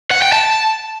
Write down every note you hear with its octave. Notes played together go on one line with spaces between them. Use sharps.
F#5
G5
A5